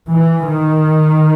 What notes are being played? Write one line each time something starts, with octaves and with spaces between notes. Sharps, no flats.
E3
D#3